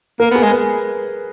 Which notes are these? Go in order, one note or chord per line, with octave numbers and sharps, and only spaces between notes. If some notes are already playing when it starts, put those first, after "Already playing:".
A#3 A#4
B3 G#4
G#3
B4